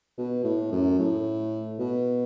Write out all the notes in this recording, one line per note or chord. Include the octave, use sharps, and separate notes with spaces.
B2
A2
F#2
A2
B2